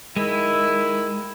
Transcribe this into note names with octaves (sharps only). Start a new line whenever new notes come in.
D#3 G#3 E4